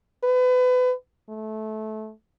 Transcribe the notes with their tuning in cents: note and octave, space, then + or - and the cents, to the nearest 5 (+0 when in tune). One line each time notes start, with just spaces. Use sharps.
B4 +30
A3 -20